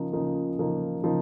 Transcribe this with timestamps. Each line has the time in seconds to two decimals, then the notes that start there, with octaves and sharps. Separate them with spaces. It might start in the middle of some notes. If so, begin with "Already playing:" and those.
Already playing: C#3 F3 A#3 D#4
0.13 C#3 F3 A#3 D#4
0.58 C#3 F3 A#3 D#4
1.03 C#3 F3 A#3 D#4